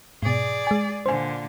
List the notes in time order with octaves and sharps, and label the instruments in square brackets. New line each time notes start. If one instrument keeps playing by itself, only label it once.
[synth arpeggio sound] G#2 B2 [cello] G#4 D5
[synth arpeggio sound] G#3 G#5
[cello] A#2 D3 [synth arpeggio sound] C5 G#5